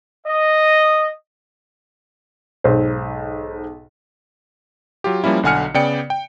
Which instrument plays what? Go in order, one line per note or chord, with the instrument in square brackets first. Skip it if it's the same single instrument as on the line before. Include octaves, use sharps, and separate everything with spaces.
[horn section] D#5
[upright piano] B1 G#2 C5
[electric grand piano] F#3 F4 G4
F3 G3 A#3 C#4 E4
B1 D3 F#5 G#5 F6 C#7
C#3 B3 D5 G5 C#7
G5